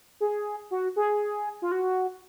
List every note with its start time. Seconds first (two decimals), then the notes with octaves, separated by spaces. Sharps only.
0.21 G#4
0.71 F#4
0.96 G#4
1.62 F4
1.72 F#4